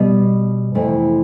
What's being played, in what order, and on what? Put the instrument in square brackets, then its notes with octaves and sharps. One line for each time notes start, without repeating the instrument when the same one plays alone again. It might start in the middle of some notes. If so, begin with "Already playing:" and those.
Already playing: [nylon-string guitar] B2 G3
F2 C3 E3 A3